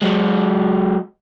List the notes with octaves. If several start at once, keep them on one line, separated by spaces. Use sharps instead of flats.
F#3 G#3